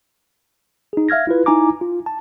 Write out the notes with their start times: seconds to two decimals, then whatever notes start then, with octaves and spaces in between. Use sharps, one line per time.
0.93 D#4 G#4
1.09 E5 F5 F6 G#6 A#6
1.27 E4 F4 B4
1.46 D#4 E4 G#5 A#5 D6
1.81 F4
2.06 A5